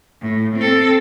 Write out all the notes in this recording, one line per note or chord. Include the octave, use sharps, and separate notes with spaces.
A2
C4 A4